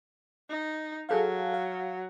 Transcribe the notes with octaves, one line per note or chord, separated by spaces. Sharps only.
D#4
F#3 G#4 A4 F5
F5